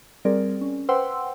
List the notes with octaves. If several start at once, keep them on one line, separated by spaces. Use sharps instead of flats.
G3 C4 G#4 A#4 D5
C#4
B4 C5 F#5 G5 C6 E6